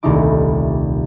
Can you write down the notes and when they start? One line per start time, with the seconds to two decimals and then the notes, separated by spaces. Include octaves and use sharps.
0.03 D#1 C2 A3 D#4 E4 D6